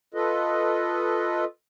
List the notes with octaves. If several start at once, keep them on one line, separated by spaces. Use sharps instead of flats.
F4 A4 B4 D#5